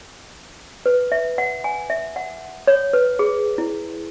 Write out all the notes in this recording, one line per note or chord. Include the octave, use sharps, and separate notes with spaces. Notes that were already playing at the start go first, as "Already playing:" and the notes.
B4
E5
F#5
G#5
E5
F#5
C#5
B4
G#4
E4